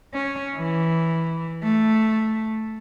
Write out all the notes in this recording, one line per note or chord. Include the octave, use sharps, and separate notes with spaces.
C#4
E3
A3